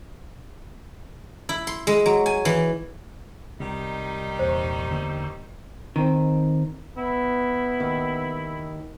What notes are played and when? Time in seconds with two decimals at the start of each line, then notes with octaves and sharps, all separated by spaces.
1.49 E4
1.67 C6
1.87 G#3
2.06 F#3
2.26 G#5
2.45 E3
3.60 C2 D#3 G3 D#4
4.39 E2 A#2 C5 C#6
4.90 E2 D3 A#3 G5 C#6 E6
5.96 D#3 C4
6.97 B3 E4
7.80 D#2 D#3